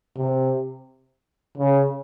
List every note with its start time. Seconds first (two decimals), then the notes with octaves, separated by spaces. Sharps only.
0.17 C3
1.58 C#3